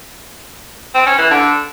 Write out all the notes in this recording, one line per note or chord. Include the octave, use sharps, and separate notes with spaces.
C4
C#4
E3
D3